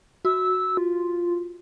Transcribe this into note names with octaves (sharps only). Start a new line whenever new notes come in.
F#4 E6
F4